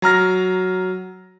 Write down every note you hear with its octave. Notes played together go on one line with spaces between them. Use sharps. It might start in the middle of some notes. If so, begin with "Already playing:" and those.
F#3 A#5 F6 A#6